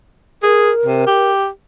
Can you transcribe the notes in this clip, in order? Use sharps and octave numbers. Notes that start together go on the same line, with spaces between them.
G#4 A#4
C3
G4